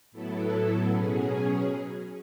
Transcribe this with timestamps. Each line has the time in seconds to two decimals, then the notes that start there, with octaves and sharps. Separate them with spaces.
0.12 A2 F#3 B3 E4 A4
0.88 B2 F#3 C#4 G#4